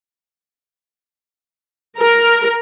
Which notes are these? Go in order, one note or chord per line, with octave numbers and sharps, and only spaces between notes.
A#4